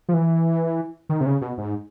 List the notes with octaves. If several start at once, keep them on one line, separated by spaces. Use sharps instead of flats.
F3
E3
D#3
C3
C#3
B2
G#2